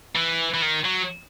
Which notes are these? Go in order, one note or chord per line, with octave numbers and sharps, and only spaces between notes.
E3
E3
D#3
F#3